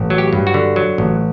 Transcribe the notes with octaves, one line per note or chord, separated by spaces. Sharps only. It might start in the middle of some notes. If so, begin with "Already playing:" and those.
Already playing: A1
F#3
G4
G2
F#4
D3
F#3
A1